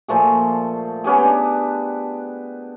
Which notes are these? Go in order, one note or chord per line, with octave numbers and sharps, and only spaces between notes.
A#2 F3 A3 G#4
B3 C#4 G4 G#4
D4